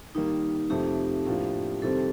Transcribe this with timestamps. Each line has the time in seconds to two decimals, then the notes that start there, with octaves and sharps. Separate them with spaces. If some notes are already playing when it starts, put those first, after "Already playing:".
0.15 D#3 G3 A#3 D#4
0.70 F2 C3 F3 A3 G4
1.26 A2 F3 A#3 D4 F4
1.82 F2 C3 D#3 G3 C4 A4